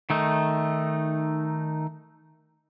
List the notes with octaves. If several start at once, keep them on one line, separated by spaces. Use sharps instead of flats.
D#3 A3 D#4